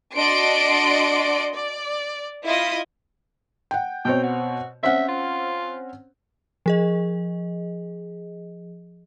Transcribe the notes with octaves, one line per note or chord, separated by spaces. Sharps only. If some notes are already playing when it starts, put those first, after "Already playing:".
D4 F#4 D5 D#5 C6 D7
D5
E4 F4 D#5 D#6
F#5 G5
B2 C4 C#5 G5
F#4
C4 C#4 E5 F#5
F4
F3 G#4 D#5